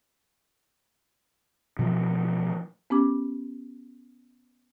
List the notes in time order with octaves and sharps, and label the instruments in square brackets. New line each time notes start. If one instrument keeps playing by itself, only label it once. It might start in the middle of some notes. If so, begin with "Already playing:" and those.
[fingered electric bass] B2 E3 F3
[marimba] B3 C#4 G4 D6